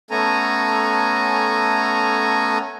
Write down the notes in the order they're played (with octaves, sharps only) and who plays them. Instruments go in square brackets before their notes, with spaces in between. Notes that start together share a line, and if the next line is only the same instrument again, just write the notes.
[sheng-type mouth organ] A3 B3 C#4 A4 G#5 A#5